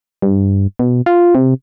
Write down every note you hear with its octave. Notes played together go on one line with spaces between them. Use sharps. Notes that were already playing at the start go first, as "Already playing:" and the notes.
G2
B2
F4
C3